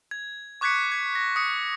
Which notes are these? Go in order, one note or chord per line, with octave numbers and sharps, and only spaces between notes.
G#6
C#6 D6 F#6 G#6 B6 C#7
G#6 B6
A#6
D#6 C#7